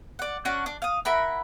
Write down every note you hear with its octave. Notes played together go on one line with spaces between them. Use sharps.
D5 F#5
C#4 D4 F#4 F#5
D4
F5 D#6
E4 A#4 F#5 B5